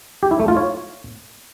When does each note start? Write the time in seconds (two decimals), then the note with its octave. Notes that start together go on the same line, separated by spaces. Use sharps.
0.23 G4
0.31 E4
0.40 A3
0.48 F4
0.57 C#5